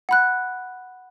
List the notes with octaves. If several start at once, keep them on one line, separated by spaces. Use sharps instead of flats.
F#5 B5 F#6